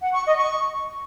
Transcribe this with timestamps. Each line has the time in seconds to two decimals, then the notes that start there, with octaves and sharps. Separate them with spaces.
0.02 F#5
0.14 C#6
0.26 D#5
0.37 C#6